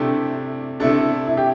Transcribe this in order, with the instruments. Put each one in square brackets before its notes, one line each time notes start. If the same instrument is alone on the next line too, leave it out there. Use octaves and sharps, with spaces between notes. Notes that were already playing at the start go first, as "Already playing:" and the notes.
Already playing: [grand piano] C3 A3 E4 G4 [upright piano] D4
[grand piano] C3 A3 E4 A4 [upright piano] D4
[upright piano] E4
G4